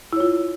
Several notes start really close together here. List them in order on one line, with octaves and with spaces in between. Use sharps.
E4 C#5 F4